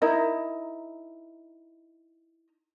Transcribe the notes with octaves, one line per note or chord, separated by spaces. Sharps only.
D#4 E4 A#4 D#5